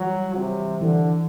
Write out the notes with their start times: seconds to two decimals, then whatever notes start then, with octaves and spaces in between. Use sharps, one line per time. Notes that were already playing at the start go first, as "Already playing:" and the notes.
Already playing: E3 F#3 G3
0.35 C3
0.81 D3 E3